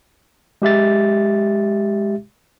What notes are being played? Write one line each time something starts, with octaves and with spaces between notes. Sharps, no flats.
G#3 G4 E5 A6